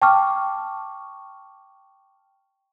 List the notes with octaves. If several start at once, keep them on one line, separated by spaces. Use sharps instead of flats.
G5 A5 C#6 D6 F6